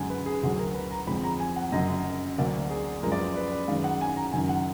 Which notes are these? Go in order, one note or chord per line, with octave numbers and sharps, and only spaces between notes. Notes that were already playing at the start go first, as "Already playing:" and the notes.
Already playing: F#2 D3 G#3 G#5
B4
G#4
D2 D3 F#3 G#4
A#4
B4
A#5
F2 D3 G#3 B5
A#5
G#5
F#5
F#1 F#2 D3 D#5
D2 D3 F#3 A#3 D5
G#4
F#2 F3 G#3 A#4
D5
B4
B4
B4
F#2 D#3 G#3 F5
F#5
G#5
A#5
F#1 F#2 D#3 G#5
F#5